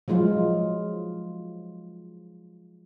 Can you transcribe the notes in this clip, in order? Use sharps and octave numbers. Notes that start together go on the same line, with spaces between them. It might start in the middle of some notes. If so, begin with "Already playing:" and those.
F3 F#3 G#3 F4